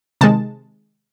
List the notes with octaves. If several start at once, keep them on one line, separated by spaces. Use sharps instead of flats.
C3 D#3 G#3 A5